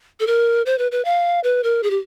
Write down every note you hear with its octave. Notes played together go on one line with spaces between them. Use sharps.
A4
A#4
C5
B4
B4
F5
B4
A#4
G#4
G4